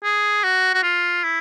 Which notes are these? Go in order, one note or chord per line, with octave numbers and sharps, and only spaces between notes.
G#4
F#4
F#4
F4
E4